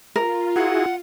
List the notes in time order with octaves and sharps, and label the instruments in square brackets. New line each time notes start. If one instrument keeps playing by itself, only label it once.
[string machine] F4 [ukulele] A#4
[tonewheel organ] E4 F#4 G#4 [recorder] F#5